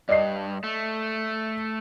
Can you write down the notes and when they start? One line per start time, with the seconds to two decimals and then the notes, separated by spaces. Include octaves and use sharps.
0.09 G2 D5 D#5 C7
0.64 A3